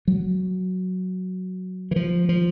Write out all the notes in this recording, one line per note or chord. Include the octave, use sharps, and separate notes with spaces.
F#3
E3
F3
F3